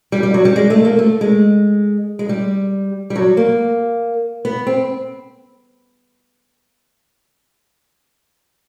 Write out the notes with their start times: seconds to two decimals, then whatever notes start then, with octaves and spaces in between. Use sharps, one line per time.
0.12 G3
0.23 G3
0.34 F#3
0.45 G3
0.56 G#3
0.70 A3
0.85 A#3
0.99 A3
1.21 G#3
2.19 G#3
2.29 G3
3.10 G3
3.16 F#3
3.37 A#3
4.45 B3
4.67 C4